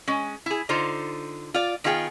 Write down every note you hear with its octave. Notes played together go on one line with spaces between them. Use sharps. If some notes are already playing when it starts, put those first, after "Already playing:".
G#3 C#4
E4 G#4
D3 D#4 F4 C5
F4 D5
D#3 B3 F4 G#4 C5 G5